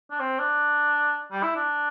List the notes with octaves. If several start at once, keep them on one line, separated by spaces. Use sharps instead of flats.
D4
C4
D4
G3
E4
D4